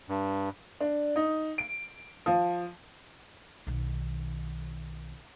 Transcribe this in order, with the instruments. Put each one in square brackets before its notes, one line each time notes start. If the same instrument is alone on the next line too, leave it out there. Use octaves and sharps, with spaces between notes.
[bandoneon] G2
[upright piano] D4
D#4
D7
F3
[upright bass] B1 D#3